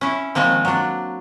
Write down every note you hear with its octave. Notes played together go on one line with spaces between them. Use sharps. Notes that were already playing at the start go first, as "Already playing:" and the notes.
C#4 E4
D#3 F3 G#3 A#3 C4
F#3 D4